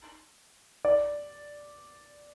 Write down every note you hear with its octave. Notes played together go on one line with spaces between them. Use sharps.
D5